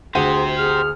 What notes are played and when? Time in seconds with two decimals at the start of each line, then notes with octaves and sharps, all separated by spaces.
0.15 D2 G4 G#4 C5 F#5 D#7
0.58 G#4 F6